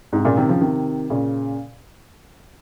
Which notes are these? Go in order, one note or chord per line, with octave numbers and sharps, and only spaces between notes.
G#2 C3
A#2 C#3
C3 D#3
C#3 F3
C3 D#3
A#2 C#3